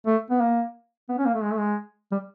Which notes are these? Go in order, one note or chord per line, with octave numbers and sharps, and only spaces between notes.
A3
B3
A#3
B3
C#4
A#3
A3
G#3
A3
G#3
G3